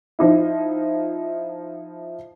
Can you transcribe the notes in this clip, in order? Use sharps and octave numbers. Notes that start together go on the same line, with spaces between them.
F3 D#4 E4